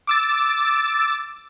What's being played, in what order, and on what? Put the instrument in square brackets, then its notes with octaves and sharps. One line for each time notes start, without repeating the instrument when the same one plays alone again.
[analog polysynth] D6 E6 A6